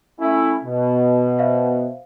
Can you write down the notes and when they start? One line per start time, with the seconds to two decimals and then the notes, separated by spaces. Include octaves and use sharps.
0.20 A3 C#4 E4
0.64 B2
1.39 C5 E5 F5